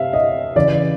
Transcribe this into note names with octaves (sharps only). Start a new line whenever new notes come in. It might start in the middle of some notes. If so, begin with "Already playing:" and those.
Already playing: C3 E5 F5
D#5
C#3 E3 D5